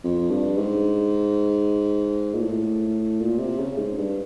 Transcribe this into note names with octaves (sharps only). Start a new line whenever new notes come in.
F2
G2
G#2
A#2
A2
A#2
C3
C#3
G#2
G2